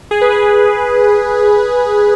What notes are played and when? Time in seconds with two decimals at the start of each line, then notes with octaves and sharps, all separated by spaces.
0.11 G#4
0.21 B4
0.32 G#4